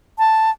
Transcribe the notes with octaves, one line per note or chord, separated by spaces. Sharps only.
A5